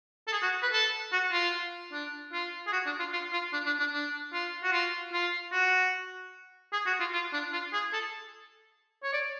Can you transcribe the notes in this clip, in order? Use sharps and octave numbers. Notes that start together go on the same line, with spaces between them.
A4
G#4
F#4
B4
A4
F#4
F4
D4
F4
G#4
F#4
D4
F4
F4
F4
D4
D4
D4
D4
F4
F#4
F4
F4
F#4
G#4
F#4
F4
F4
D4
F4
G#4
A4
C#5
D5